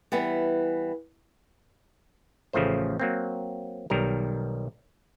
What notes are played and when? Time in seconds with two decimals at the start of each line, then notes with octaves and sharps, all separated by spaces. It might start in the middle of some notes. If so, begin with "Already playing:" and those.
0.12 E3 G3 B3
2.53 A1 C#3 F3 A3 C5
3.00 F#3 A#3 C4
3.90 B1 D#3 G3 A#4